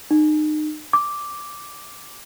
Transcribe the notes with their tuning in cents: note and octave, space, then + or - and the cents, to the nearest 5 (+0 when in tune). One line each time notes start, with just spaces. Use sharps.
D#4 -30
D6 -5